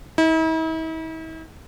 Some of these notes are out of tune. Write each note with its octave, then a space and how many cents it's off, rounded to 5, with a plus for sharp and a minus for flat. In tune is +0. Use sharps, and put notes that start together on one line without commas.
E4 -45